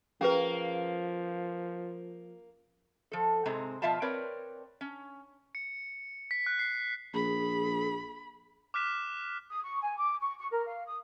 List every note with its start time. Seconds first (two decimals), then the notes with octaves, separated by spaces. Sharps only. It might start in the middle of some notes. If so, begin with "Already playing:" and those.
0.21 F3 A#3 C#4 G#4 A#4 B4
3.12 F3 A4
3.45 G#2 C3 G#3 C4 A#5
3.82 B2 F3 F4 E5 F5 A5
4.02 C4 A#4 B4 C#5 D5
4.81 C#4
5.55 C#7
6.31 B6
6.46 F#6
6.59 C7
7.14 A#1 G#4 B5
8.74 D6 F6 F#6 B6 E7
9.49 D#6
9.64 C#6
9.83 G#5
9.97 D6
10.21 C#6
10.39 C#6
10.51 A#4
10.67 F5
10.86 D#6